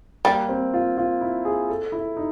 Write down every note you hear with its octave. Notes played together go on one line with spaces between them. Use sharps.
G3 A#3
C4
F4
F4
E4
G#4
A4
E4
D#4